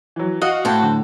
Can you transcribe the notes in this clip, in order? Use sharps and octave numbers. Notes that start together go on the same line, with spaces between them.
E3 F#3
F#4 D#5 F5
A2 C5 G5 A5
D3